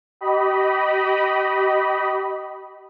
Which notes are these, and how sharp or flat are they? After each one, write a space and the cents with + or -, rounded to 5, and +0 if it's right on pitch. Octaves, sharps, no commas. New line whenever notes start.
G4 -35 D#5 +0 B5 -10